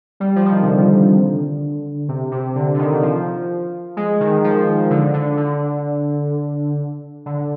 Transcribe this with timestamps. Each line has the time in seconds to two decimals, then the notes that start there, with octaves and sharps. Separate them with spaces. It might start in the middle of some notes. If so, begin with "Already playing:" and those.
0.20 G3
0.36 F3
0.46 F3
0.51 D#3
0.62 C3
0.67 D3
2.08 C3
2.32 C3
2.49 C3
2.55 D3
2.74 D3
2.79 D#3
2.93 D#3
3.02 F3
3.97 G#3
4.20 D#3
4.44 F3
4.90 D3
5.14 D3
5.37 D3
7.26 D3